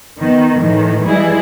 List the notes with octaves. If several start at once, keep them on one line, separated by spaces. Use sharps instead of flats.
D#3 B3
A2 D#3 E3
E3 G3 G#3 E4 G#4